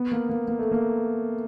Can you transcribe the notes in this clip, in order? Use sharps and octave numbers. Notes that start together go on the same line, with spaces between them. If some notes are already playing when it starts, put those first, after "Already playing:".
Already playing: B3
A#3
A#3
A#3
A3
A#3